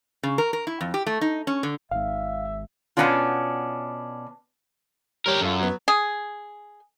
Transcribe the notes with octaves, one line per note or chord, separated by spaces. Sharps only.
C#3
A#4
A#4
E4
F2
G4
A3
D#4
C#4
D3
G#1 G#2 E5 F5
B2 D#3 B3 C#4 D4 F4
G3 G4 A#4 C#5
F#2 F4 A4
F#3 B3
G#4